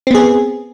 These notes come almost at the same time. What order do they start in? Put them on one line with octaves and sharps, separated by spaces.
C4 B3 G#4